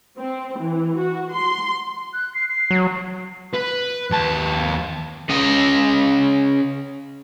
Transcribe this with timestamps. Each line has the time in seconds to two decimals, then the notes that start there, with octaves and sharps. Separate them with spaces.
0.19 C4
0.59 E3
0.99 F#4
1.33 C6
2.13 F#6
2.35 C7
2.49 C7
2.71 F#3
3.53 B4
4.11 D#2 A5
5.29 C#3 D#5